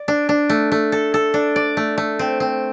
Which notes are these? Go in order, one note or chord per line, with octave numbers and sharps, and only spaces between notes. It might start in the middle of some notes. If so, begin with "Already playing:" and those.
Already playing: D5
D4
D4
A3
A3
A4
A4
D4
D5
A3
A3
C4
C4